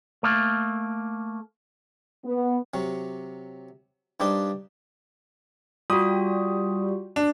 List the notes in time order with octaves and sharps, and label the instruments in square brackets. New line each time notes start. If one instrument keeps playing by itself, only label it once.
[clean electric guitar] A3 A#3
[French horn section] B3
[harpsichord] C3 F#3
G2 D4 D#4 G4 C5 C6
[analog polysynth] G3 [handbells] F4 F#4 [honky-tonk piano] D#6
[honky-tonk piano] D4